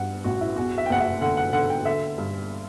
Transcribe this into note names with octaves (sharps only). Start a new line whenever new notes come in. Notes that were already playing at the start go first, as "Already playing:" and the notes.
Already playing: G2 F#5
A1 F#4
E4
E2 F#4
E5
G5
F#1 F#5
E5
D3 F#5
F#5
D3 F#5
G5
D3 E5
G2